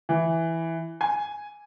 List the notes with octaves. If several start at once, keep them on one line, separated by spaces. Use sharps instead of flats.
E3
G#5